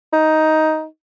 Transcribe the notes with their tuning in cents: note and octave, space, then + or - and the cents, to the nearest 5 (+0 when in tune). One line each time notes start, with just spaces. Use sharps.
D#4 +10